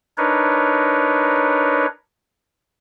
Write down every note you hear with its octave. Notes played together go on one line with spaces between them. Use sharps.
D4 D#4 A#4 B4 C#5